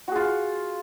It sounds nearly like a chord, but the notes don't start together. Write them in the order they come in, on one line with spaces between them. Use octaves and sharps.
F#4 G#4 F4